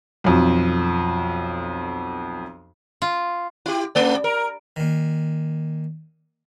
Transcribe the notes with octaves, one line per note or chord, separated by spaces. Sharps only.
B1 F2
F4
E4 G4
G2 A3 D5
A#4
A#2 D#3